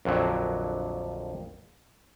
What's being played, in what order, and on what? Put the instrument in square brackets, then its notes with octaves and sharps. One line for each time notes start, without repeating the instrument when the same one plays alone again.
[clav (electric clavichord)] A#1 F2 D3 F#3